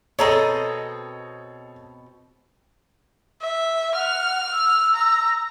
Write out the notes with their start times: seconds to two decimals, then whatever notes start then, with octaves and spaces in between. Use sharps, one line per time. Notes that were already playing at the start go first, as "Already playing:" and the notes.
0.19 B2 C4 G#4 A4 C#5 D#5 A#5
3.41 E5
3.94 F#5 F6
4.52 E6
4.94 A#5